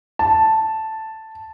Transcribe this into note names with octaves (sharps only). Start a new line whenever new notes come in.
A5